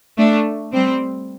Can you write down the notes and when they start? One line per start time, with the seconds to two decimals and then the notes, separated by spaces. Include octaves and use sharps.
0.18 A3 D4
0.73 G3 C4